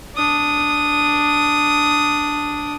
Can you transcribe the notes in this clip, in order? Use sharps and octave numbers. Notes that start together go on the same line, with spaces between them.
D4 D#6